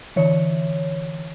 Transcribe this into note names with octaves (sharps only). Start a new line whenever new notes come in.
D3 E3 C#5